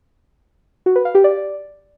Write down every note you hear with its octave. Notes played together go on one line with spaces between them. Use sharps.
F#4
B4
F5
G4
D5